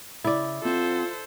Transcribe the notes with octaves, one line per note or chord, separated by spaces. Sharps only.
C#3 E4 D5
E3 C4 F4 A4 C5 F#5